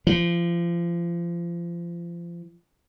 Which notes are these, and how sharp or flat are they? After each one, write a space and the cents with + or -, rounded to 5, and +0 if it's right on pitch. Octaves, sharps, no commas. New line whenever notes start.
F3 -30